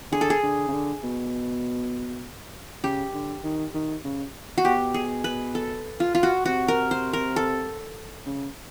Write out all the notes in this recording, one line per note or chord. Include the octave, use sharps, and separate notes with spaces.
D3 G#4
A4
G#4
D3
C#3
D3
B2
C#3 G4
D3
D#3
D#3
C#3
F#4
B2 G4
G#4
B4
A4
F4
F4
F#4
C3 F#4
A#4
C5
A#4
A4
C#3